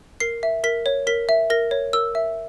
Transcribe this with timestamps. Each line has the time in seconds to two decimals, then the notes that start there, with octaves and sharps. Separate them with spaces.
0.20 A#4 C7
0.43 E5
0.64 A#4 B6
0.86 C#5
1.07 A#4 B6
1.29 E5
1.50 A#4 A#6
1.71 C#5
1.93 A#4 E6
2.15 E5